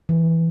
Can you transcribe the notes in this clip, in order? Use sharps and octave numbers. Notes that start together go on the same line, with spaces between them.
E3